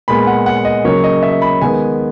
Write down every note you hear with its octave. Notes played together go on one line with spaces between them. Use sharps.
A#2 G#3 B3 B5
F#5
F#5
D#5
C#3 F#3 A#3 C#5
D#5
E5
B5
D#3 G#3 B3 G#5